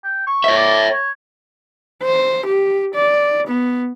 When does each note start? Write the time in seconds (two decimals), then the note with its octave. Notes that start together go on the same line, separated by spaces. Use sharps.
0.04 G5
0.27 C#6
0.44 C#5 E5
0.57 D5
0.92 C#5
2.02 C5
2.47 G4
2.94 D5
3.47 B3